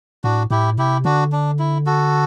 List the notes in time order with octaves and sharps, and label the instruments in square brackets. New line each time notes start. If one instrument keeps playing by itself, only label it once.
[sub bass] A2 [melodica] D4 F#4
[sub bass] A2 [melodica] E4 G4
[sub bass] C3 [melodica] E4 G4
[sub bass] D3 [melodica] D4 F#4
[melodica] D4
E4
F#4 A4